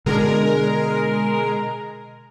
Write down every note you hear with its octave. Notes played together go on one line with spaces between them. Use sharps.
B2 D3 G#3 D4 A#4